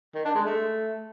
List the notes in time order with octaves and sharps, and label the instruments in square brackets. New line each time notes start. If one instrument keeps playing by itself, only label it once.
[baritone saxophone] D#3
D4
G#3
A3